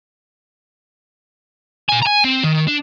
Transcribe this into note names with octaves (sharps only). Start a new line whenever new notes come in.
A#2 G#5
G#5 A#5
C4
D#3
D4